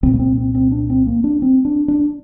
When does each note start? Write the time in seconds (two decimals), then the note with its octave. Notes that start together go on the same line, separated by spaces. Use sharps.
0.03 C2 A#2 C4
0.13 A#3
0.19 C4
0.38 C4
0.55 C4
0.72 D4
0.90 C4
1.07 A#3
1.24 D4
1.42 C4
1.65 D4
1.88 D4